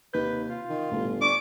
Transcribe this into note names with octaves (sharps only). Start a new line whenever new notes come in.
D#2 C3 B4 G6
F4
D#3
G1 A2
D4 D5 C#6 D6